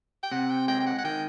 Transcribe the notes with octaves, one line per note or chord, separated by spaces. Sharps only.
G5
C3 F#5
G5
G#3 G5
G5
F#5
F#5
D#3 G5